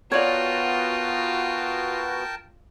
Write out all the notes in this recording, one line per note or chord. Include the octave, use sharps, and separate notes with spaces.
B3 F4 F#4 A#4 C#5 D5 G5 A5